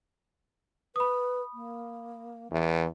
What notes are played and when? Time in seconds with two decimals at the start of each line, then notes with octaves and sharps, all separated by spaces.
0.96 B4 B5 D#6
1.54 A#3
2.52 E2 E3